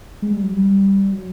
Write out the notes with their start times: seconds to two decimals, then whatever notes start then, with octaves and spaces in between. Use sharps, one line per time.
0.22 G#3
0.33 G3
0.43 F#3
0.53 G3
1.13 F#3